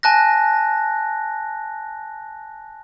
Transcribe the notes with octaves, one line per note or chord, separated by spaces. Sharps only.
G#5 A5 F#6 A#6